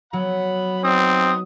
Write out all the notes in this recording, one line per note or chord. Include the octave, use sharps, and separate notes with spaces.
F#3 F#5 B5
B3 C4 D#4 D#6